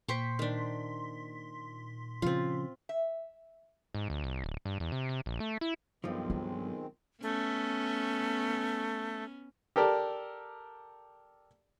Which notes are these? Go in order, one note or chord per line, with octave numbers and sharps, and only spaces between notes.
A#2 C5 G5 C6 C#6 B6
D#3 D4
C#3 F3 C4 F4
E5
G#2
D2
C2
D1
G2
E2
C3
C3
A#1
A3
E4
B1 G2 D#3 F3 G#3 C4
F4
A3 B3 C#4
G4 A4 A#4 D5